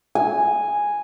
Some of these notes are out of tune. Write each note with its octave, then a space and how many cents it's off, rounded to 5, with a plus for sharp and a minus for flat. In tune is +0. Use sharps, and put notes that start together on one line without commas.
G#5 -5